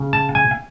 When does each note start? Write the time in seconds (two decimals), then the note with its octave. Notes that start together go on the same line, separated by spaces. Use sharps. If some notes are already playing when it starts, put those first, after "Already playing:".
Already playing: C#3
0.13 A5
0.35 G#5